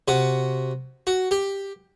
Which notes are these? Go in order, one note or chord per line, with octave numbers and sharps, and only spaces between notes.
C3 F#4
F#4
G4